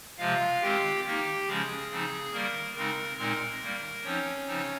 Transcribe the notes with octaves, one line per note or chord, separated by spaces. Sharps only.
C3 F3 G#3 F4 F5
D#3 G#3 C4 G4 G5
D#3 A#3 D#4 G4 G5
C#3 F3 G#3 C#4 G#4
C#3 F3 C4 D#4
D#3 G3 A#3 A#4
C#3 G#3 C4 D#4 A#4
A#2 G#3 C4 D#4 A#4
D#3 G3 A#3
F3 C4 C#4 D#4 C#5
C#3 F3 C4 D#4